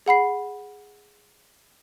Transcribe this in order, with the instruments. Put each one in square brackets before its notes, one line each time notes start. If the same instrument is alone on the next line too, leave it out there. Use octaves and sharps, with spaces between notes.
[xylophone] G#4 F#5 B5 C7